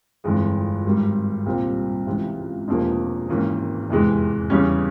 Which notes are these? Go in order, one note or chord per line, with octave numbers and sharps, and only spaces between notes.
G1 F2 E3 G#3
G#1 G#2 G3
C2 A#2 G3 C4
C#2 C3 E3
E1 E2 C3 F3 A#3
G#1 G#2 E3 A#3 C#4
F1 E2 C3 E3 G#3
E2 C#3 E3 G3 C#4